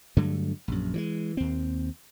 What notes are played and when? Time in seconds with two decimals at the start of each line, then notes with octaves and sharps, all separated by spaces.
0.17 G2 D3 F#3 A3
0.68 A#1 F#2
0.94 E3 F#3 G#3
1.37 D#2 C4